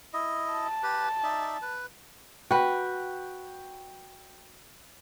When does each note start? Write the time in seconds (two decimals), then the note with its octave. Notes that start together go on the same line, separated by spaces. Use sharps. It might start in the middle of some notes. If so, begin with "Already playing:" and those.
0.13 E4 D#5
0.53 A5
0.83 G4 B4
1.23 D#4 D5 E5
1.62 B4
2.51 F#4 B4 G5